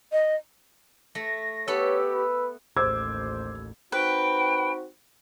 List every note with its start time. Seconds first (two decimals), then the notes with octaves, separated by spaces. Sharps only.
0.12 D#5
1.15 A3 A#6
1.68 B3 G4 A4 C#5 B5 E6
2.12 B4
2.77 A1 D#2 C5 D6 E6 G#6
3.92 C4 D#4 F#4 B4 G5